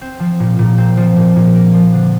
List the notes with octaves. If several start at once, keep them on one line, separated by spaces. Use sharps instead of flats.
C4
F3
A#2
A#2
C4
F3
A#2
A#2
A#3
F3
D3